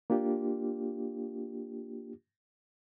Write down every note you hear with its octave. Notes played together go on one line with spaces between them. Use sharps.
A#3 D4 F4 G4